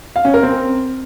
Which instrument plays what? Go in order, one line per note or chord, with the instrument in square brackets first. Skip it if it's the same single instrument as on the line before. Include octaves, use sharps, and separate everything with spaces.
[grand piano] F5
C#4
A#4
C4